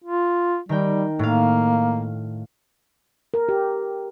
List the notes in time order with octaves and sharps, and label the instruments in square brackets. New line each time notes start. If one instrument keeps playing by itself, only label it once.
[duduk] F4
[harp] D#3 A#4 G5 [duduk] G3
[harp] A2 F5 [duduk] A#3
[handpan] A#4
G4